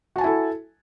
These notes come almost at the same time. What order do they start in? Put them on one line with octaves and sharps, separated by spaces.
F#4 A5 G#5 E4 A4